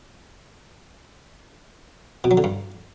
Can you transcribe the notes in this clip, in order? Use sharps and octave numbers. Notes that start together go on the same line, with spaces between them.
B2
F#3
D3
G2